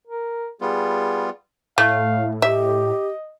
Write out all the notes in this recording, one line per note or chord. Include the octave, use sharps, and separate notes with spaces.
A#4
G3 B3 F4 G#4
A2 A3 F5
G4 D#5 E5